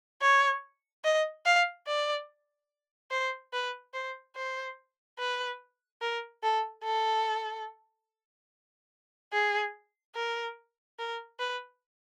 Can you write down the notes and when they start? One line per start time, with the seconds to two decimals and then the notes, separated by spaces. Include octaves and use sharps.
0.21 C#5
1.04 D#5
1.46 F5
1.87 D5
3.11 C5
3.53 B4
3.94 C5
4.36 C5
5.19 B4
6.01 A#4
6.43 A4
6.84 A4
9.33 G#4
10.15 A#4
10.99 A#4
11.39 B4